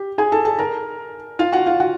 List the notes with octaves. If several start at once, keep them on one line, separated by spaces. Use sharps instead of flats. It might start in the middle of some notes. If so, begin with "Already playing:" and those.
Already playing: G4
G#4 G#5
A4 A5
A4 A5
A#4 A#5
F4 F5
F#4 F#5
F4 F5
F#4 F#5